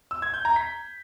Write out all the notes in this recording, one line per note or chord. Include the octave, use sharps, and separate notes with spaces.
E6
G#6
G6
A#5
B6